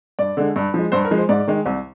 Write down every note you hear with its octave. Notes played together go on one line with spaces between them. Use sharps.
G2 D5
D3 G#3
G2
F3 G#3
G2 C5
A#4
F3 G#3
C5
G#2 D5
D#3 G#3
C2